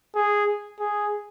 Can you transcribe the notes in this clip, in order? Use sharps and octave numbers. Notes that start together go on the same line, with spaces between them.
G#4
G#4